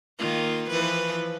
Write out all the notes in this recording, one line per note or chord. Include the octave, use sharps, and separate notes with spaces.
D#3 A#3 F4
E3 F3 B4